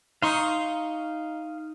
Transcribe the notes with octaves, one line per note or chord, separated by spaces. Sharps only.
D#4 F5 C6 C#6